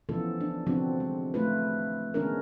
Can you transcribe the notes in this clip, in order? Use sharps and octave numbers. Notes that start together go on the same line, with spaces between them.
E3 F3 B3 C#4 F4 A4
D4
D3 F3 F#3 C4 D4 F#4
G#3
A3 F4 B4
D#3 G#3 B3 C#4 D4 A#4